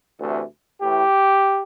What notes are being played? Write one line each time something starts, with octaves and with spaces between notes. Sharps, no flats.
D2 C3 E3 A3
A2 E3 A3 G4